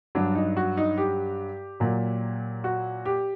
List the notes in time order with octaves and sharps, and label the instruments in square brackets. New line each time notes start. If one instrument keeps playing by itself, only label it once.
[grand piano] G2 F#3 D4
D#4
F#4
D#4
G4
A#2 F#3
F#4
G4